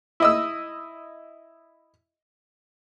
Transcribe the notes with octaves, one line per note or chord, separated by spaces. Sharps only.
E4 D#5 E6